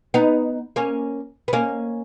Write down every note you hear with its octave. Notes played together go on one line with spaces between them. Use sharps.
B3 D#4
A#3 C#4
B3
A#3 C#4